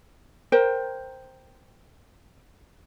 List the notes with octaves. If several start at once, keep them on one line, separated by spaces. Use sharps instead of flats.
A#4 C5 G5